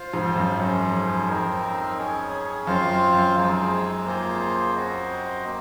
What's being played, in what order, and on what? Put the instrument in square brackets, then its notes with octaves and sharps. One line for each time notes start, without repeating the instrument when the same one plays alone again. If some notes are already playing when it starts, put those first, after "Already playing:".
Already playing: [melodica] F4 C5 F5
[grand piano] F2 G#2
F2
F#2
[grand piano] F#2 [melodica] C#4 G#4 C5
[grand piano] F2
F2
[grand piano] F2 [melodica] C4 D#4 A#4
[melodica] C#4 G#4 C#5
[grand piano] F#2 [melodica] C4 F4 C5 F5
[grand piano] F#2
F#2
[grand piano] F2 [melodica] G#3 C4 D#4 G#4
[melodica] A#3 F4 G#4 C5
C4 F#4 C5 D#5
A#3